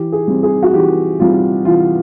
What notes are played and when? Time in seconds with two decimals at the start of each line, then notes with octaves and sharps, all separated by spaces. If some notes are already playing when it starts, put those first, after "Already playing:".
Already playing: E3 G4
0.12 G#4
0.28 G3 C4
0.43 G#4
0.63 F#4
0.74 E3 G4
1.20 G3 C4 F4
1.65 E3 F4